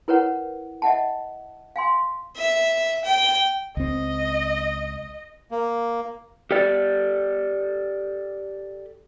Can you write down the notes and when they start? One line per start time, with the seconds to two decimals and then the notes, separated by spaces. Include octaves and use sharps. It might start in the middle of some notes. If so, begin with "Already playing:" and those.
0.08 E4 A#4 B4 C#5 F#5
0.82 D#5 E5 F#5 A5
1.76 F5 G#5 C6
2.37 E5
3.04 G5
3.77 C#2 C4 D#5
5.51 A#3
6.51 G4 A4 D5